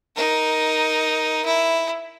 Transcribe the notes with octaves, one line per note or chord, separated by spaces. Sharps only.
D#4 A#4
E4